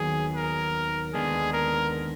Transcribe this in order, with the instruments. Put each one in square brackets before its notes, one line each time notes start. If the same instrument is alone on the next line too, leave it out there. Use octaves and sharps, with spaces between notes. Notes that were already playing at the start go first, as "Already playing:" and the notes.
Already playing: [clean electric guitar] D#2 D#3 F#3 B3 [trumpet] G#4
[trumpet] A#4
[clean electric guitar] D#2 D3 G#3 B3 D4 [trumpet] G#4
[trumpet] A#4